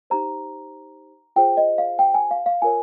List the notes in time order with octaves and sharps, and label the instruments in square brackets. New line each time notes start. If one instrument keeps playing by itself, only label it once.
[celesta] D#4 G4 C5 A#5
F4 G#4 C5 G5
D#5
F5
G5
G#5
F5
F5
F4 A#4 C#5 G#5